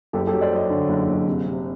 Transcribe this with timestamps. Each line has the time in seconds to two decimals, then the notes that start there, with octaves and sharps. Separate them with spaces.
0.13 F#1 G4 A4
0.27 G4 A4
0.32 F#3
0.41 C5 D5
0.51 F#3 C#5 D#5
0.70 D3
0.89 F#1
1.08 F#1
1.26 C3
1.46 C3